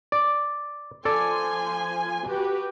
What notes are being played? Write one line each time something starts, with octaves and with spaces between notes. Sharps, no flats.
D5
F3 A4 D5 G#5 C6
F#4 G4 B4